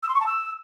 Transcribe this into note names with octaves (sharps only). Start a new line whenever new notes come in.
E6
C6
C#6
A5
E6